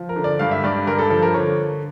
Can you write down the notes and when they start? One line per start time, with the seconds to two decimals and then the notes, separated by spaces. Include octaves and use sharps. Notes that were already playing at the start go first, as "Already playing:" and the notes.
Already playing: F3
0.09 A#4
0.16 D3
0.24 D5
0.39 G2 F5
0.51 E5
0.64 G2 D5
0.87 G2 A#4
0.99 A4
1.10 F3 A4
1.22 A#4
1.34 D3 C#5